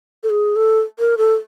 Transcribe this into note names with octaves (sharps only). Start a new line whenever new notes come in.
A4
G#4
A4
A#4
A4